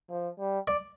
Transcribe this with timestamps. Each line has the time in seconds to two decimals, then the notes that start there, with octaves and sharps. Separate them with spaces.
0.10 F3
0.39 G3
0.68 D5